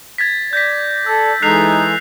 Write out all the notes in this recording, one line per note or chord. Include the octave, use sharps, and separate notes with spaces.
G#6 A6 B6
D5 G6 A#6 B6
A4 E6
E3 G#3 D#4 A4 F#6 C7 F7